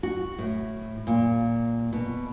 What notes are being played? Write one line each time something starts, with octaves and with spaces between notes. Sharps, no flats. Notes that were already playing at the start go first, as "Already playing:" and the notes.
F#4
A2
A#2
B2